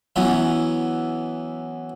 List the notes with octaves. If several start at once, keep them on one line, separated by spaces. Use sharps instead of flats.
E3 F#3 B3 C#4 E4